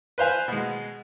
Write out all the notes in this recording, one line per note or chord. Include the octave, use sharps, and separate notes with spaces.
B4 C5 F5 G#5
B2 G#3